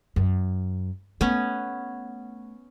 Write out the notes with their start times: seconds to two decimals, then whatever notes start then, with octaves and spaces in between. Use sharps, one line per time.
0.16 F#2
1.21 A3 B3 C#4